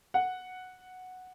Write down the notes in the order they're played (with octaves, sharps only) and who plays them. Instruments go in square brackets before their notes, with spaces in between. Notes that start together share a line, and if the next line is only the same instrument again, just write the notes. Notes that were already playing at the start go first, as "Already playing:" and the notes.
[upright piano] F#5